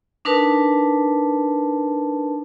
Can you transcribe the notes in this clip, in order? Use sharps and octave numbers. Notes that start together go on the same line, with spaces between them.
D4 D#4 A#4 B4 A5